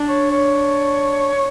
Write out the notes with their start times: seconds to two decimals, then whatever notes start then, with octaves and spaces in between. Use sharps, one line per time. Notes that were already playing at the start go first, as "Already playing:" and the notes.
Already playing: D4
0.09 C#5
0.31 C#5